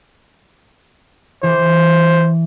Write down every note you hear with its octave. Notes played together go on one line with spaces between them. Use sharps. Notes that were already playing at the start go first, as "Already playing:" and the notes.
E3 C5